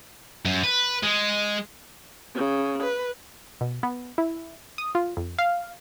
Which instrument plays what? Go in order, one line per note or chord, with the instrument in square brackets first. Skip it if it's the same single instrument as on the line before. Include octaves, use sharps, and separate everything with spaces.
[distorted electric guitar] F#2
B4
G#3
[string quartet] C#3
B4
[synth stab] B2
B3
E4
D#6
F4
F2
F5